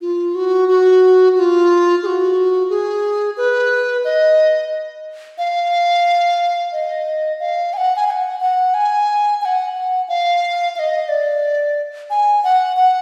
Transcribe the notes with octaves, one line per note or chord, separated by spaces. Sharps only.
F4
F#4
F#4
F#4
F4
G#4
F#4
G#4
B4
D#5
F5
D#5
F5
G#5
F#5
G#5
G#5
F#5
F#5
G#5
G#5
F#5
F5
F5
D#5
D5
G#5
F#5
F#5